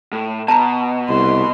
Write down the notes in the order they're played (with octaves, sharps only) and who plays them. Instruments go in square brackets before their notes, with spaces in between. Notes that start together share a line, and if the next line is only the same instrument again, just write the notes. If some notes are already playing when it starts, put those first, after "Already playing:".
[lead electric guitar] A2
[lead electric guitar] B2 [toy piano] A5 A#5
[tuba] C2 [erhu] C6